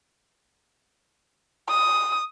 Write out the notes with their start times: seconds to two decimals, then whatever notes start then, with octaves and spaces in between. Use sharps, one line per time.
1.69 D#6